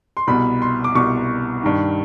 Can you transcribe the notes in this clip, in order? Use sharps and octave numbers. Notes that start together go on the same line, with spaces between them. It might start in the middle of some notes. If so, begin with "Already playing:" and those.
C6
C2 B2 B5
C6
D6
C2 B2 C#6
G2 D#3